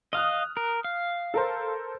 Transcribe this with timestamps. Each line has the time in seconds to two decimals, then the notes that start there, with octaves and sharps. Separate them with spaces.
0.13 D#5 F5 D#6 F6 F#6
0.57 A#4
0.84 F5
1.34 A4 A#4 C5